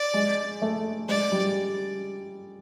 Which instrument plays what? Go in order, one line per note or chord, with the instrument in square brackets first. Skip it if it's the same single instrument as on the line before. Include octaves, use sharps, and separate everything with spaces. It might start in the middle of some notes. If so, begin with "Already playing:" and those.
Already playing: [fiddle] D5
[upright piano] G#3
A3
[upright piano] G#3 [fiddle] D5
[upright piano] G3